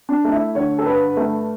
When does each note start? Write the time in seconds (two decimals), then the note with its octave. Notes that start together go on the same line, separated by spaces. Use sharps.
0.09 D4
0.25 A3
0.32 E4
0.55 D3 C#5
0.78 A4
0.86 G2 B4
1.17 A3